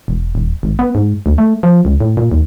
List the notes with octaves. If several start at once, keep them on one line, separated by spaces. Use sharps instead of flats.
E1
D#1
G#1
B3
G#2
D2
A3
F3
C#2
A2
A#2
D#2